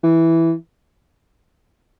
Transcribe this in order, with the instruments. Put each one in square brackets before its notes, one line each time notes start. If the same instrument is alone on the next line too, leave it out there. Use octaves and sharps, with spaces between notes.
[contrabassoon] E3